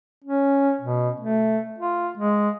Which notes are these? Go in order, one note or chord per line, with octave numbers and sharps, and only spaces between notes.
C#4
B2
A3
F4
G#3